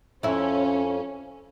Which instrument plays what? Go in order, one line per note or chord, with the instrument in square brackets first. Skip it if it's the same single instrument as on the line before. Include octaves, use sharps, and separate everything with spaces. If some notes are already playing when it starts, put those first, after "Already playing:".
[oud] F2 E4 [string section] C#4